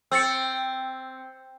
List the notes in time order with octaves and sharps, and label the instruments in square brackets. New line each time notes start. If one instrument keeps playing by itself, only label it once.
[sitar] C4 [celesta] E6 A6 C#7